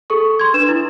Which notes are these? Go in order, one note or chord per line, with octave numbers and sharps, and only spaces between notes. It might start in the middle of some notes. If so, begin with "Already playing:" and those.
G#4 A4 C#6
C6 G#6
D4 B4 E7
E4